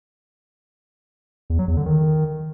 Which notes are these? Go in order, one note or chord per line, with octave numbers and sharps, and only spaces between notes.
E2
F#3
E2
D3
D#3